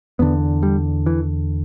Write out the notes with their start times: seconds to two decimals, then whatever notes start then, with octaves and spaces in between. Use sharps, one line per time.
0.19 E2 D3 B3
0.63 G3
1.06 E3